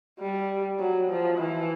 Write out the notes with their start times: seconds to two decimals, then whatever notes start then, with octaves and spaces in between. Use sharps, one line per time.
0.19 G3
0.79 F#3
1.09 F3
1.38 E3